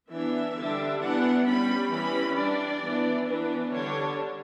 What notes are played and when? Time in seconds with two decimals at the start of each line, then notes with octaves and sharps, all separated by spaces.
0.10 E3 B3 D4 E5
0.56 D3 G3 D4
1.00 E3 B3 D4 F#5
1.45 G3 C#4 B5
1.90 E3 G3 C#4 B5
2.35 G3 D4 D5
2.81 E3 B3 D4
3.25 E3 B3 D4 B4
3.71 D3 G3 D4 C#5